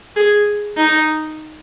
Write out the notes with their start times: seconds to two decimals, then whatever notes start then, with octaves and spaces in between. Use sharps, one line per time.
0.16 G#4
0.77 D#4